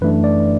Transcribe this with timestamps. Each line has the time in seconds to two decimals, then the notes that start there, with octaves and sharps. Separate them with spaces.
0.01 F#2 E3 A3 D4 B4
0.24 D5